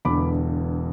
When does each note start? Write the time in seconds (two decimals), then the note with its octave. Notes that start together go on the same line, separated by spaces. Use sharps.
0.05 E1 E2 D3 B5 D6